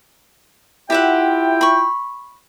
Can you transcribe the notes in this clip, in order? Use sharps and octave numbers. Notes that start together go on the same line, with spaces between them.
E4 F4 G4 E5 F#5 G5
B5 C#6